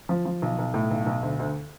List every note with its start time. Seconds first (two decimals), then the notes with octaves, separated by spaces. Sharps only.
0.09 F3
0.25 F3
0.42 B1
0.59 B1
0.74 A2
0.91 B1
1.06 B1
1.22 D2
1.39 D2